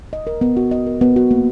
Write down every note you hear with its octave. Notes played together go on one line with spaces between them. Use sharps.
D#5
A#4
B3
F#4
D#5
A#4
B3
F#4
A#3